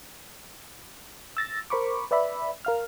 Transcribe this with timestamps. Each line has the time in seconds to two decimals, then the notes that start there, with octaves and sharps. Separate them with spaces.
1.37 E6 A6 A#6
1.70 A#4 C5 B5 C#6 D6
2.11 B4 D5 E5 B5
2.65 A#4 F5 F6